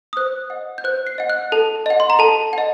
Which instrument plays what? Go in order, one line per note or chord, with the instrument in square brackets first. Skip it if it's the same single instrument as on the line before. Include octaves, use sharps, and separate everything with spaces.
[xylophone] D#6
C5 F#6
D#5 F#5
G6
C5 F#6
C7
D#5 F#5
F#6
A4 A5
D#5 F#5
C6
A#5
A4 A5
D#5 F#5